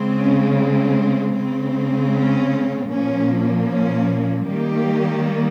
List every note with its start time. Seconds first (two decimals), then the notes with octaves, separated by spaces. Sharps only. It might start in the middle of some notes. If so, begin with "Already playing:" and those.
Already playing: C#3 G#3 C4
0.18 C#4
0.56 C4
1.34 C#3 G#3 C4
2.13 C#4
2.90 A#2 F3 A#3 C#4
3.69 C#4
4.47 D#3 G3 A#3 G4